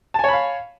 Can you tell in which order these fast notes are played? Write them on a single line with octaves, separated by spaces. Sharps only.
A5 G#5 C#5 B5 F5